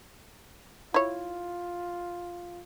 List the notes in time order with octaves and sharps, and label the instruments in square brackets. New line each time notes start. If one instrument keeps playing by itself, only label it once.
[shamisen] E4 C#5 [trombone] F4